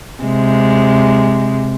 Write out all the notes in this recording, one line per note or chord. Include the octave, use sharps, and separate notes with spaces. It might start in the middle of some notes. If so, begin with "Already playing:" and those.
C3 G#3